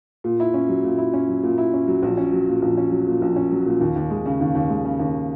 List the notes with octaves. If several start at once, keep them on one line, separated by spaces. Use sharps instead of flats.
A#2
E4
C#4
F#3
A#2
E4
C#4
F#3
A#2
E4
C#4
F#3
A#1
C#4
F#3
A#2
A#1
C#4
F#3
A#2
A#1
C#4
F#3
A#2
D#2
D#2
G#3
C#3
D#2
D#2
G#3
C#3
D#2